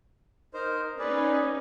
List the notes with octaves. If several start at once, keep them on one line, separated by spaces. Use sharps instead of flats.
D#4 A#4 C5
C#4 D#4 G#4 B4 D5